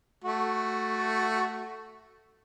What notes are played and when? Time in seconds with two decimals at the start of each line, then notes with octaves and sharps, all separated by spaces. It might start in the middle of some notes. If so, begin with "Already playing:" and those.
0.24 A3 F#4